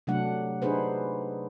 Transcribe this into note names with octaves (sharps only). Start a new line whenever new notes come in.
C3 F#3 A3 D4 F#5
D4 D#4 G#4 B4 C5